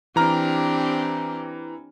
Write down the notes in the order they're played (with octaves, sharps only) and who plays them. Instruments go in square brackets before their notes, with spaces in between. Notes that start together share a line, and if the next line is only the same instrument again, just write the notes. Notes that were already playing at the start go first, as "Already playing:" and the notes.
[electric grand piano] E3 A#5 F6 [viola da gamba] C4 D4 G4